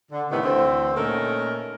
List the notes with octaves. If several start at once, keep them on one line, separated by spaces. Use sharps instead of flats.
D3
A2 C3 D#3 E3 A3 B3
D2 D3 E3 A3 C4
A#2 A3 C#4 D#4 A#4